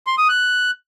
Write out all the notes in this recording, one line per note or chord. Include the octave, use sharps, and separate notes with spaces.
C6
D#6
F#6